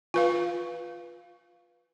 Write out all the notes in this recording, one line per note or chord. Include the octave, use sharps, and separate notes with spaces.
F4 B4 F5